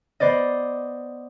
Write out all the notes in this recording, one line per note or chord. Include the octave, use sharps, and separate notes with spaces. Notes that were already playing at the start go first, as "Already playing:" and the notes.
B3 C5 D5 D#5